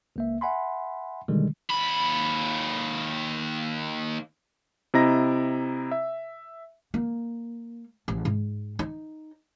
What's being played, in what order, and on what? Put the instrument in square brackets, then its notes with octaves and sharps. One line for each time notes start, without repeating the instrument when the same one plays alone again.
[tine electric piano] C#2 A#3 E5
E5 F#5 G#5 B5 C6
B2 D3 D#3 G3 G#3
[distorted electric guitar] D#2 B5
[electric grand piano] C3 E4 D#5 A#5 A#6
E5
[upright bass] A#3
A1
G#2
D#4